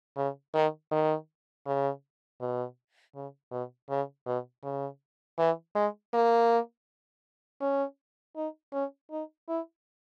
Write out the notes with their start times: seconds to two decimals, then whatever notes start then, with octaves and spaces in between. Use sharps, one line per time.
0.17 C#3
0.54 D#3
0.92 D#3
1.66 C#3
2.41 B2
3.15 C#3
3.52 B2
3.90 C#3
4.26 B2
4.64 C#3
5.39 E3
5.75 G#3
6.13 A#3
7.61 C#4
8.36 D#4
8.73 C#4
9.11 D#4
9.49 E4